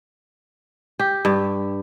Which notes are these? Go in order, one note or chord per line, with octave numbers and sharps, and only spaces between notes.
G4
G2